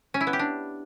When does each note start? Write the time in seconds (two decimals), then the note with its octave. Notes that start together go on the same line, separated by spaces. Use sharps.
0.14 C#4
0.21 E4
0.27 B3
0.33 G4
0.39 D4